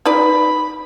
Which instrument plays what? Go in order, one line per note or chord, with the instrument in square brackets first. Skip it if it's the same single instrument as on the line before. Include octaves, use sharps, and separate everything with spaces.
[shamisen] D#4 B4 D5 [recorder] B5